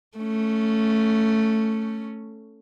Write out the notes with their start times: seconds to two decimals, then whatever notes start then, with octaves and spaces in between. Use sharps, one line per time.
0.18 A3 C#4